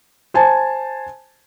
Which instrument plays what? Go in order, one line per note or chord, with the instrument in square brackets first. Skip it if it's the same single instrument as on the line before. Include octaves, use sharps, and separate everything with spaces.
[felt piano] C5 G#5 A5